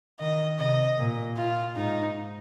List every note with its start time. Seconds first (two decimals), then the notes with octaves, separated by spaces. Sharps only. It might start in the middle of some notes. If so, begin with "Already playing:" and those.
0.20 D#3 D#5
0.59 C3 D#5
0.98 A#2
1.37 F4
1.76 G#2 D#4